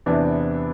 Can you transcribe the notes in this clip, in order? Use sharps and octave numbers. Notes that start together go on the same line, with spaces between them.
E2 C3 E3 B3 D4